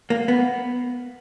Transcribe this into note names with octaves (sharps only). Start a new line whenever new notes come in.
A#3
B3